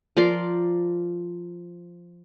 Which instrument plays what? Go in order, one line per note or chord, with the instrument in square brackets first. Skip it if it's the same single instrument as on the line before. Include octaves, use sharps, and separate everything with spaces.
[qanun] F3 A#4 D5 C6